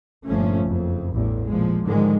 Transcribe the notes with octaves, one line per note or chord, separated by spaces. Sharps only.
G1 A#2 F3 A3 C#4
F#1 F2
A1 E2 G2
A#2 F3 G#3
G#2 D3 D#3 F3 G#3